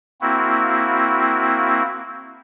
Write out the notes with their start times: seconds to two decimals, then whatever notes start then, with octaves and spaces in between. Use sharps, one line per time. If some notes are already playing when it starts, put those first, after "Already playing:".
0.21 A#3 C4 E4 F#4